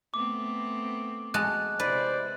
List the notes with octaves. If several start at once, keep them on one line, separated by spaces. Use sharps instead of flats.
A3 B3 C4 D6
G#3 F#4 A5 F#6
C3 E4 B4 C5 D5